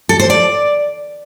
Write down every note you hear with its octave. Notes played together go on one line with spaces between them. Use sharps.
A4
C5
D5